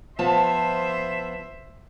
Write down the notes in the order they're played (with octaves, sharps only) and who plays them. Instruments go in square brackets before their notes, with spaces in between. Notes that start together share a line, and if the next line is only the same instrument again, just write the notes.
[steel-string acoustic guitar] F3 B3 A5 [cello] C5 E5